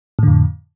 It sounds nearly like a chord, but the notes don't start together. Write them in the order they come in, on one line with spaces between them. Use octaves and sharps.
A2 D3 F2